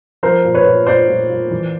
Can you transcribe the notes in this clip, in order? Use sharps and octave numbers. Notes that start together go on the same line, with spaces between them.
F3 A#4 C5
A#2
B4 C#5
A#2
A#2 C5 D5
A#2
A#2
E3